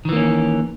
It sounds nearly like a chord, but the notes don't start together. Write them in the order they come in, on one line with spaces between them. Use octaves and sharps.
D#3 E3 A#3 C#4